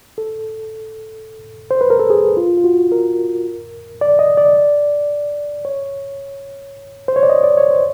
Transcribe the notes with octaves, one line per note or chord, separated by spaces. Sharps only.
A4
C5
B4
A#4
A4
G#4
F4
F4
F#4
A#4
D5
D#5
D5
C#5
C5
C#5
D5
D#5
D5
C#5
C5